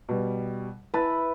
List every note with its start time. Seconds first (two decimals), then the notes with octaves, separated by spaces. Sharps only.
0.09 B2 G3
0.94 E4 B4 A5 B5 A6